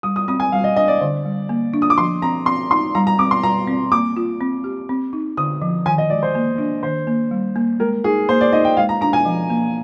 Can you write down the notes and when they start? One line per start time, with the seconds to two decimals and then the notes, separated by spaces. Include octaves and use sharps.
0.03 G3 D#6
0.16 D#6
0.28 C4 D#6
0.40 G#5
0.52 G3 F5
0.64 D#5
0.76 D4 D#5
0.88 D5
1.01 D3
1.25 G3
1.49 A#3
1.74 D4
1.82 D#6
1.90 D6
1.98 F3 C6
2.22 C4 A#5
2.46 C4 C6
2.71 D#4 C6
2.95 G3 A#5
3.07 A#5
3.18 C4 D6
3.31 C6
3.43 G3 A#5
3.68 C4
3.92 A#3 D6
4.16 F4
4.41 C4
4.64 G4
4.89 C4
5.13 D#4
5.37 D3 D#6
5.62 F3
5.86 D#3 G#5
5.98 D#5
6.10 G#3 D5
6.23 C5
6.35 A#3
6.58 D4
6.83 D#3 C5
7.07 A#3
7.31 G3
7.56 A#3
7.80 G#3 A#4
8.04 D#4 G#4
8.29 A#3 C5
8.41 D5
8.52 D#4 D#5
8.65 G5
8.77 G#3 F5
8.89 A#5
9.01 D4 A#5
9.13 G#5
9.25 F3
9.50 A#3